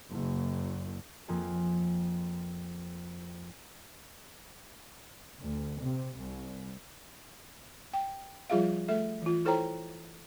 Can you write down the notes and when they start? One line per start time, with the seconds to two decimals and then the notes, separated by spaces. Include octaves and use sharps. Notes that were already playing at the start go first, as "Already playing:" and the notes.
0.10 F#1
1.28 F2 F3 A#3 G#4
5.40 D2
5.80 C3
6.18 C2
7.94 G5
8.50 F3 G3 F4 G#4 E5 F5
8.88 A3 A4 E5
9.22 E3 F4
9.45 E4 A4 C5 C#5 G5 A#5